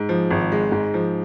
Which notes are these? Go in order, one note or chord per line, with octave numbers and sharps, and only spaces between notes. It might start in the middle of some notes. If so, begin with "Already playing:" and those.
Already playing: G#2
F3
G#1
G#3
G#2
F3